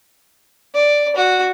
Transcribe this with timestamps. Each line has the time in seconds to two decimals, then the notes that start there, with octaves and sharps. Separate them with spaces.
0.74 D5
1.16 F#4